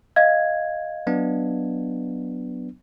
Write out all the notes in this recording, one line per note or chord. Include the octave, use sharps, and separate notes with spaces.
D#5 F5 G#6
F#3 B3 D4